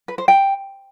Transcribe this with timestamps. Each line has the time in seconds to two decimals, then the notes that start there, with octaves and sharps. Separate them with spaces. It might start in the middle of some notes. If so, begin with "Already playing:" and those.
0.08 B4
0.18 C5
0.28 G5